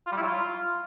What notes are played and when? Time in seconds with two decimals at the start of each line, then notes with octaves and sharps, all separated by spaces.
0.07 F4
0.12 G3
0.17 E4
0.22 F#3
0.27 F4